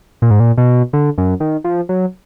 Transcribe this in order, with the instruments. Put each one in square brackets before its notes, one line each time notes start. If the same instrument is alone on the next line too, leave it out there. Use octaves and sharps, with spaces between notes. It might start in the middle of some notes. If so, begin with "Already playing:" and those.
[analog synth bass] A#2
G#2
A#2
B2
D3
F#2
D#3
F3
F#3